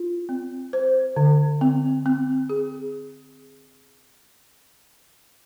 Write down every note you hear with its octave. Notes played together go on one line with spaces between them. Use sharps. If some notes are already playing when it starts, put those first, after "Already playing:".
Already playing: F4
C4
C5
D3
C4
C4
G#4